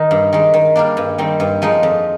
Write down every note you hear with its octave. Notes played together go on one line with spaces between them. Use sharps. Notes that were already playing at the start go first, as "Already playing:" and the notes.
Already playing: D#3 D#4
G2
D#3 G#3
D#3
G3 A#3 D4
G2
D#3 G3 C4
G2
F3 G#3 D#4
F2